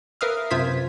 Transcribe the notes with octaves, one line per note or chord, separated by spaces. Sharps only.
A#4 B4 E5 F5 D#6 F6
F#2 C3 F4 C5 G#6 B6